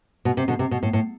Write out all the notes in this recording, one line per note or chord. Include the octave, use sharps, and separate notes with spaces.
B2
C3
B2 D3
C3
B2
A2
A2